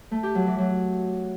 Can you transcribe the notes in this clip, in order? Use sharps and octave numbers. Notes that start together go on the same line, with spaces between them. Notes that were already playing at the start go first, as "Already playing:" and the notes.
A3
G4
F#3
E3
F#3